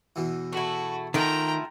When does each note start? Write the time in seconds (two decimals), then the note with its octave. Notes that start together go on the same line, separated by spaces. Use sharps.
0.16 E2 B2 E3
0.53 A3 E4 F#4
1.14 D#3 A3 E4 F4 F#5 G5 A#5